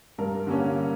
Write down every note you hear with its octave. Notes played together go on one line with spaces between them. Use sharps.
G2 A#4
D3 G3 A#3 C#4